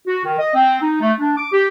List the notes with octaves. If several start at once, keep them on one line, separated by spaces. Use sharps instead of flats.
F#4
D#3
D#5
C4
D#4
A3
D4
D6
G4